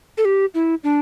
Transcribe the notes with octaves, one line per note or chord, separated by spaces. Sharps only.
A4
G4
E4
D4